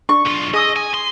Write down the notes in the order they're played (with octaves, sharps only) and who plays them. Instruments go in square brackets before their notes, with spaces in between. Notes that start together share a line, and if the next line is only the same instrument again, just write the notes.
[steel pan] D4 [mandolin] C#6
[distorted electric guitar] B1 F4
[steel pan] G#4 D#6 E6 [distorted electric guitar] D#5
[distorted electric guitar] G#5
C6